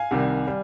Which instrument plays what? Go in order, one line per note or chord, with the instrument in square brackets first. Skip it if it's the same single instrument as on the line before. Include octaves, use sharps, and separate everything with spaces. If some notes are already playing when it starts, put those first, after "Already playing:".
Already playing: [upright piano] F5 G#5
C2 C3 D#3 G3
G3